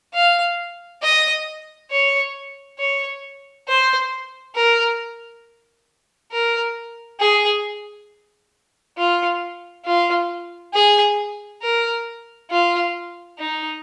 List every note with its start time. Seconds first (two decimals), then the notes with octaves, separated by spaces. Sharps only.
0.14 F5
1.03 D#5
1.91 C#5
2.79 C#5
3.68 C5
4.56 A#4
6.32 A#4
7.20 G#4
8.98 F4
9.85 F4
10.73 G#4
11.62 A#4
12.51 F4
13.39 D#4